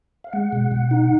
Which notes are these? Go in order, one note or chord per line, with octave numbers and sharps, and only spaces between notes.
F5
G#3 F#5
B2
B2
D#4